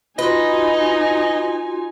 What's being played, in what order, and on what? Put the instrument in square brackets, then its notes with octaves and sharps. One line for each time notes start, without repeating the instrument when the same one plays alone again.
[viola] D#4 G#5 [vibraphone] F4 F#4 C6 [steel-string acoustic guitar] B4 [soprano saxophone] D#5